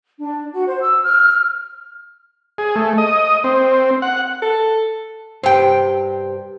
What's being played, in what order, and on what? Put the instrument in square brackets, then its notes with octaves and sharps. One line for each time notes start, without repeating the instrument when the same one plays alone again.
[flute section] D4
F#4
C5
E6
F6
[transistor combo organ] G#4
A3
D#5
C4
F#5
[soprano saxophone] A4
[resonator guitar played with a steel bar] G2 G5 [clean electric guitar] G4 C5